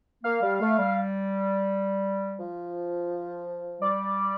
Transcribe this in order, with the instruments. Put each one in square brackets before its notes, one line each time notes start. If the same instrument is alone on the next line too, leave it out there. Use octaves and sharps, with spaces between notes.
[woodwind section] A#3 [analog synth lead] F5
[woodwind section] G3
A3
G3
F3
[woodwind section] G3 [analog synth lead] D5